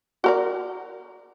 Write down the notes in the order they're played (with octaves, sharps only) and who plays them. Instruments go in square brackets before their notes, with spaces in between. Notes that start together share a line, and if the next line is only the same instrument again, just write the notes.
[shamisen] F#4 A#4 D5